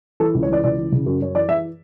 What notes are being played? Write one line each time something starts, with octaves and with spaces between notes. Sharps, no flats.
E3 A4
C#2
C#5
E3 D5
C#2 D5
E3
C#3
F#2
F#2 C#5
E3 D5
E3 E5